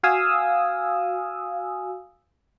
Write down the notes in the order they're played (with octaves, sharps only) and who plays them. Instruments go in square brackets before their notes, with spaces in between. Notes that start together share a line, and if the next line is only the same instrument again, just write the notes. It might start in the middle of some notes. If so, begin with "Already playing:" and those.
[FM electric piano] F#4 F5 G#5 D#6 E6